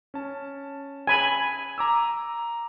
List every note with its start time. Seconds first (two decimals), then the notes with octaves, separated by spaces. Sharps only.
0.14 C#4 A5
1.07 G#5 B5
1.78 A#5 D6 E6